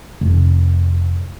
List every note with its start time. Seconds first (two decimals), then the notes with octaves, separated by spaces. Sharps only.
0.21 F1